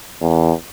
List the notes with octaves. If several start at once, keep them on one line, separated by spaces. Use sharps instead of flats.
E2